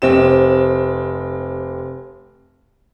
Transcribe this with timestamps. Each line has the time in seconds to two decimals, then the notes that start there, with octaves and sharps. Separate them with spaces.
0.02 F1 C4 G4 E7